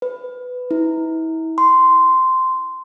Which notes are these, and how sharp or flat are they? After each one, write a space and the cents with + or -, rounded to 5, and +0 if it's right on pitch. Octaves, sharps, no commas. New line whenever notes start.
B4 +15
E4 -35
C6 -10